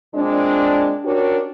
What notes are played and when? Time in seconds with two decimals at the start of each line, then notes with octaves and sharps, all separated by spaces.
0.15 A#2 G#3 C4 D4
1.04 C#4 D4 F#4 G4 A#4 C#5